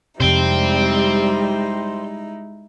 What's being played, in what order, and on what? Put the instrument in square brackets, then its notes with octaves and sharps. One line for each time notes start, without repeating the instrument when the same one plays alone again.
[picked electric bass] F2 C3 [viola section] G3 [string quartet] G#3 D#4 E4 [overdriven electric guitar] C5 G5